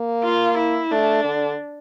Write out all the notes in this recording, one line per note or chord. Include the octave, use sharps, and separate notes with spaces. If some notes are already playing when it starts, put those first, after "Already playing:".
Already playing: A#3
F4
E4
A3 D4
D3